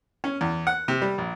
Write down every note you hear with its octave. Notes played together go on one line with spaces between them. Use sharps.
C#4
E2
F#5
C3
G3
A#1